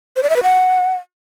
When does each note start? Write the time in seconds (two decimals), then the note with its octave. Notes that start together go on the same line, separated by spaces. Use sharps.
0.16 C5
0.23 D5
0.30 E5
0.36 B4
0.43 F#5